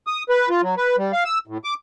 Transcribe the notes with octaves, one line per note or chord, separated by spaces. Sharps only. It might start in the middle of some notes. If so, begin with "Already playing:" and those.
D#6
B4
F4
F#3
B4
G3
F5
E6
A2
D6